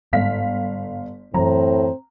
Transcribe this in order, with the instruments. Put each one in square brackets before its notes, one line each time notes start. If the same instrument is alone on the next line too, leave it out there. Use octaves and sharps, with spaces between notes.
[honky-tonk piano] G1 F5 B6 [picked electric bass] G#2
[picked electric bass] F#2 E3 F#3 [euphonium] A2 [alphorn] C4 [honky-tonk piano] A#5